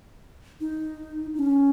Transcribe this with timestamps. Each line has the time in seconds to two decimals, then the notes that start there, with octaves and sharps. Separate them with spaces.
0.61 D#4
1.34 D#4
1.39 C#4